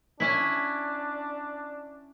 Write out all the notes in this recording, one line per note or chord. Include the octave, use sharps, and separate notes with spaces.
C#4 D4 E4